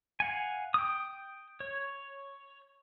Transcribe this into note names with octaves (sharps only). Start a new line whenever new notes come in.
F5 F#5 G#5
G5 D#6
C#5